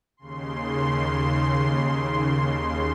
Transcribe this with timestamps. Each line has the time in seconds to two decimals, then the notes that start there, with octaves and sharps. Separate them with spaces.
0.17 D#2 C#3 C6